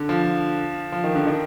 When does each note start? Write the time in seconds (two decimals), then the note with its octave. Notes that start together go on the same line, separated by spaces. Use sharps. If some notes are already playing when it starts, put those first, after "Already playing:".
Already playing: D3
0.09 F3
0.92 F3
1.04 D#3
1.15 D3
1.27 D#3